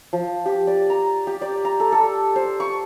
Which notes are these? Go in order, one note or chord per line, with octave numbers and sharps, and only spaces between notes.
F3
G4
D5
A#5
G4
D5
A#5
A4
A4
C5
C#6